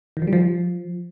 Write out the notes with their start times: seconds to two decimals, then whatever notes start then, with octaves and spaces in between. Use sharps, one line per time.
0.17 D#3
0.22 F3
0.27 G3
0.33 F3